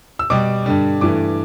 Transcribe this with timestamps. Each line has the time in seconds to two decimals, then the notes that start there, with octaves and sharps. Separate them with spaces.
0.19 E6
0.30 B2 G3 D6
0.66 G2 D3 G3
1.01 G2 E3 A3 D6